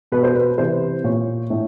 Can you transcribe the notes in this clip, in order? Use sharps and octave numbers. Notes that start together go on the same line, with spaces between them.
B2 B4
C5
B4
C3 E3 C5
A#2 C#5
A2